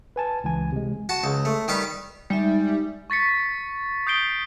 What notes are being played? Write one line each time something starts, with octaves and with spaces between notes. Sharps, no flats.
B4 G#5 A5
C#2 E3 G#5
C3 G#3
F#4 A5
C#2
A3
D#3 G3 G4 B4 D6
G3 G#3 D#4 E5
C#6 A6 B6 C#7
D#6 G6 C7 D7 G7